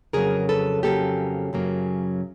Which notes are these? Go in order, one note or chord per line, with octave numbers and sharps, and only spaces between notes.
F2 C#3 F#3 A#3 G#4 A#4
A4 B4
F2 C#3 F#3 A#3 G4 A4
F#2 C#3 F#3 A#3